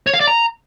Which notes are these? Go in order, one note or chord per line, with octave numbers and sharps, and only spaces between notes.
C#5
F5
D5
A#5